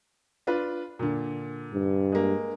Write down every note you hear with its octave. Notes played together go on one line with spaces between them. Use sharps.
D4 F4 B4
A#2 D3
G2
G#3 A#3